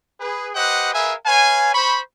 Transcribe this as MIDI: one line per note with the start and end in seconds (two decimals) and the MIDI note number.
0.20 0.50 68
0.20 0.50 71
0.55 0.91 67
0.55 0.91 71
0.55 0.91 72
0.55 0.91 75
0.55 0.91 78
0.94 1.14 68
0.94 1.14 70
0.94 1.14 71
0.94 1.14 76
0.94 1.14 77
0.94 1.14 80
1.26 1.73 71
1.26 1.73 73
1.26 1.73 77
1.26 1.73 80
1.74 1.99 72
1.74 1.99 83
1.74 1.99 85